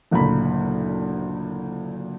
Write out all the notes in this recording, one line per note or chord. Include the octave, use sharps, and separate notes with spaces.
F#1 D2 A#2 A#3 B5